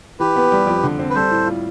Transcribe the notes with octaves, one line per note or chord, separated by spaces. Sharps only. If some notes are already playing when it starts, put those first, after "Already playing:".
E3 G4 B4
B3
G3
F2
D3
C4
B4
G3 A4 C5
A2
F4